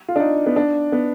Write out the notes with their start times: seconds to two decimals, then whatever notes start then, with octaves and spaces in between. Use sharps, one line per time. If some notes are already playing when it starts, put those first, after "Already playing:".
0.08 F4
0.16 D4
0.20 D#4
0.46 B3
0.56 D4
0.92 B3